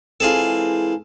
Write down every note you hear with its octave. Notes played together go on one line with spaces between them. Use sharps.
E3 G#3 C4 F4 G#4 A4